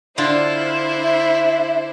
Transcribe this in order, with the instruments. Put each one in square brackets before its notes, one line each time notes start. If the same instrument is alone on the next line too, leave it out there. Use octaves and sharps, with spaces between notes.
[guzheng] D3 F4 [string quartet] D4 E4 C5
[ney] E5